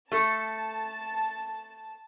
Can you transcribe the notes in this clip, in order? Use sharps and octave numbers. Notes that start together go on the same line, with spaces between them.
A3 A4 A5